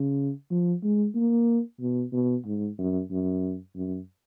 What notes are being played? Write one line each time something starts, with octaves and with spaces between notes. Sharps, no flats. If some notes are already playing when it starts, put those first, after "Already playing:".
Already playing: C#3
F3
G#3
A#3
B2
B2
G#2
F#2
F#2
F#2